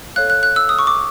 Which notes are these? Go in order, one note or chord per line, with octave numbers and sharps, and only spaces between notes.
A4 C#5 F5 F#6
F#6
F#6
E6
D#6
C#6
D6